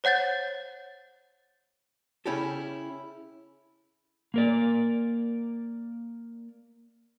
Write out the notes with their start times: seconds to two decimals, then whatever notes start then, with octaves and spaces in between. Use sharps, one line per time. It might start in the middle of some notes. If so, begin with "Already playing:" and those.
0.04 C5 C#5 F#5 G6 A6
2.26 C#3 C#4 E4 G4 A4
4.34 A#3 A#4 D5